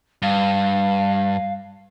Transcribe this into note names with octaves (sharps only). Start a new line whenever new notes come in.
G2 F5